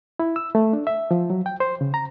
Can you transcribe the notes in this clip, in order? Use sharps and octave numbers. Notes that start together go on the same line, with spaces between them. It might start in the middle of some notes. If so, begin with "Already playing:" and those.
E4
E6
A3
D4
E5
F3
F#3
G5
C5
C#3
A#5